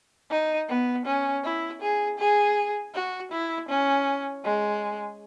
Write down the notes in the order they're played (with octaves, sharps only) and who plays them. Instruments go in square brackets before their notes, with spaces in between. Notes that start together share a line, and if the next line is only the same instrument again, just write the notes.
[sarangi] D#4
B3
C#4
E4
G#4
G#4
F#4
E4
C#4
G#3